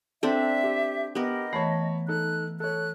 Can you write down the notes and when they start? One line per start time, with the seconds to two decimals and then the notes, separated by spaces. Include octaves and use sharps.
0.23 C4 D4 A4 E5
0.64 G4
1.15 B3 G4 A#4 D#5
1.53 E3 A3 C#5 A5 B5
2.08 D#4 A4 F#6
2.60 A4 C#5 F#6